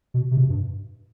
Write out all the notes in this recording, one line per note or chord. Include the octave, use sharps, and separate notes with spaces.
B2
C3
B2
G2